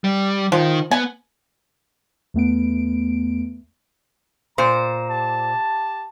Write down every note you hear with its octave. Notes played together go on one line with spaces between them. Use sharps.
G3
D#3 F3
B3 G#5
E2 A3 B3 D7
A#2 C5 A#5
G4 A5